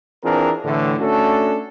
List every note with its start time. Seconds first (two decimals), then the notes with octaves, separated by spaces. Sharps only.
0.23 E3 C4 D4 F4 G#4 A#4
0.65 A2 D3 E3
1.00 A3 C#4 D4 F#4 A4